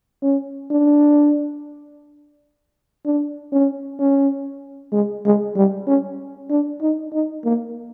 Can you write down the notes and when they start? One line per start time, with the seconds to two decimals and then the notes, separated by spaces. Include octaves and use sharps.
0.23 C#4
0.71 D4
3.06 D4
3.53 C#4
4.00 C#4
4.93 G#3
5.25 G#3
5.56 G3
5.88 C#4
6.50 D4
6.82 D#4
7.13 D#4
7.45 A#3